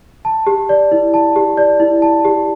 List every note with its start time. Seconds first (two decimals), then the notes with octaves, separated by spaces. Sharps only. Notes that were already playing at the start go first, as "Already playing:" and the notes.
0.25 A5
0.47 G4
0.69 D5
0.92 E4
1.14 A5
1.36 G4
1.57 D5
1.80 E4
2.02 A5
2.25 G4